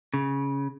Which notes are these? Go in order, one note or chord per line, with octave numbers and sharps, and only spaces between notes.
C#3